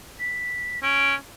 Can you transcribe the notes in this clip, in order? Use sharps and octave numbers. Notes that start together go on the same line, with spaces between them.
B6
C#4 D7